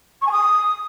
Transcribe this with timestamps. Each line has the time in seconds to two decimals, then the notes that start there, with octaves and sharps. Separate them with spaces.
0.22 C#6
0.27 G#5
0.32 D#6